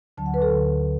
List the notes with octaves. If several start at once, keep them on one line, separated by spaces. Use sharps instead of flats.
D2 D3 F#3 A5
F#5
B4
A4
D2 D3 F#3